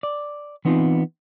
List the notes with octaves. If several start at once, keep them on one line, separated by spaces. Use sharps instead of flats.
D5
E3 B3 C4 D#4 F4